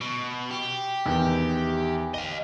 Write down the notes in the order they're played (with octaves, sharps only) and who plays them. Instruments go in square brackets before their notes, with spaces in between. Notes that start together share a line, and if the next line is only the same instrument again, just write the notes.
[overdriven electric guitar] B2
G4
[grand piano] E2 D#3
[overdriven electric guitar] D#5 F5 [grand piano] G7